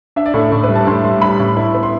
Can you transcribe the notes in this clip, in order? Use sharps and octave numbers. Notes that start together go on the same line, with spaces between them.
D4 E5
D5
A2 A4
A2
B4
G3
A5
A2 C6
G3 C6
G3 B5
A2
E4
B3
C6